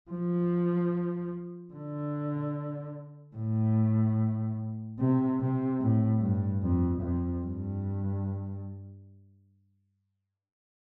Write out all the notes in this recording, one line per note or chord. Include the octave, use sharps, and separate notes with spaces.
F3
D3
A2
C3
C3
A2
G2
F2
F2
G2